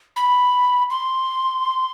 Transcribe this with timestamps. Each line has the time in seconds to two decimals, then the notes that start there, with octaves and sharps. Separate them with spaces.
0.16 B5
0.90 C6